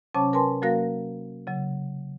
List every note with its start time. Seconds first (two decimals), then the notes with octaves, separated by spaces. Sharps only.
0.15 C3 F#3 C#4 C#5 A5 D6
0.33 A#4 B4 G#5 A5 C6
0.62 F#3 A#3 F#4 A#4 F5 A#6
1.47 C#3 F#3